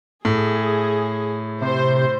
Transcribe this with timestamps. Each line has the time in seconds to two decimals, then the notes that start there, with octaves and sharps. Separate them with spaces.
0.25 A2 G#4
1.61 C3 C5